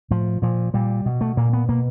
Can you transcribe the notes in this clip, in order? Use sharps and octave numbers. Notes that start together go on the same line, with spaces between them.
A2 F3
A#2 F3
A#2 G3
B2
A3
A#2 A#3
B3
B2 A#3